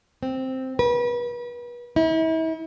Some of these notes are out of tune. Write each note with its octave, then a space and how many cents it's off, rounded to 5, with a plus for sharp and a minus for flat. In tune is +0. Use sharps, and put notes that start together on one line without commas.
C4 +0
B4 -35
E4 -40